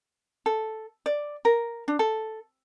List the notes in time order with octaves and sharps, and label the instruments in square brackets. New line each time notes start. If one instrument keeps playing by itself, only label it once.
[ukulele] A4
D5
A#4
D4
A4